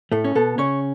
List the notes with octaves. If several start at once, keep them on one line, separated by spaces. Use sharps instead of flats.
A2 A3 A4
C#4
B2 B3 A4
C#3 C#4 C#5